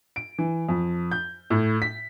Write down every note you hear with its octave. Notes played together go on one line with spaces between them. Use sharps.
D7
E3
F2
G6
A2
B6